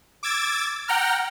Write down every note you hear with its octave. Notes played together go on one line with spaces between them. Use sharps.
D6 E6 G#6 A6
F#5 G5 A#5 F6